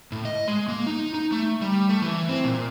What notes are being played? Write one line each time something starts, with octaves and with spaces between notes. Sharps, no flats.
A2
D#5
G#3
A#3
D#4
D#4
A3
G3
A3
E3
C4
A#2